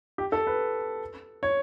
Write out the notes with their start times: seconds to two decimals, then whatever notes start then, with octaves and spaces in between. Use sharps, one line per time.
0.18 G4
0.32 A4
0.47 B4
1.43 C#5